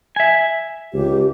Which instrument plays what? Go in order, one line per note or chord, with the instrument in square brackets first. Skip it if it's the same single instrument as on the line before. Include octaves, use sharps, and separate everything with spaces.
[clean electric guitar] E5 G#5
[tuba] C#2 [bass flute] G4